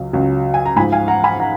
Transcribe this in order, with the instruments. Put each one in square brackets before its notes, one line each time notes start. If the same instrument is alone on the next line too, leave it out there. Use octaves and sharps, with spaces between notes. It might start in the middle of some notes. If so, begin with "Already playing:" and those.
Already playing: [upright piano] C#2 C#3 F#3
C#2 C#3 F#3
G#5
A#5
G#2 F3 G#5 B5
F5 G#5
F#5 A#5
G#5 B5
F#5 A#5